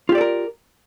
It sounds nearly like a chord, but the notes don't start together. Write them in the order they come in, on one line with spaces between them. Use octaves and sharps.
F4 G4 D5 A4 A#4